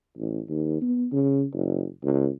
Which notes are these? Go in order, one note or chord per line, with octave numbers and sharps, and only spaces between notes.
A1
D#2
B3
C#3
F#1
C#2